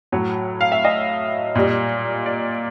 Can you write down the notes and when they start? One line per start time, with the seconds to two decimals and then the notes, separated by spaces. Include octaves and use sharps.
0.12 A2 F#3 C#5
0.61 F5
0.72 E5
0.85 D#5
1.55 A#2 G3
2.26 D5